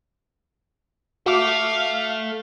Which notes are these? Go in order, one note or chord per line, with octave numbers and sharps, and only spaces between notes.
F#4 A4 E5 F5 D6